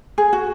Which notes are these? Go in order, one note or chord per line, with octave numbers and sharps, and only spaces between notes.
G#4
F#4